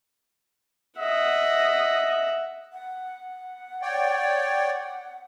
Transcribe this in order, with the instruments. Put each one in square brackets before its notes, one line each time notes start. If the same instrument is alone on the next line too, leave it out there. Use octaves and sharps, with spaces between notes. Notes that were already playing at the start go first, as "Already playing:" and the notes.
[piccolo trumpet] D#5 [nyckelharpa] E5 F#5
[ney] F#5
[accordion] C#5 D5 G5